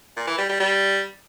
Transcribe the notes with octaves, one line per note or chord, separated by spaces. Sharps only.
A#2
E3
G3
G3
G3